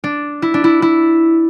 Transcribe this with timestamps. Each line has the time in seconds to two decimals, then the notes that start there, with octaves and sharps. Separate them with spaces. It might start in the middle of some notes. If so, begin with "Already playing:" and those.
0.04 D4
0.42 E4
0.54 D4
0.64 E4
0.82 E4